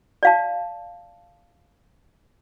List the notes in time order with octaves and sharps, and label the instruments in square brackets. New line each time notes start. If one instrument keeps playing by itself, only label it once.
[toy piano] D5 F5 A5